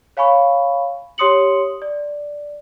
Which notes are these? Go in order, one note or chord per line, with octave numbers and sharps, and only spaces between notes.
C#5 F5 G#5 B5 C#6
G4 C#5 C6 D#6 C#7 F#7
D5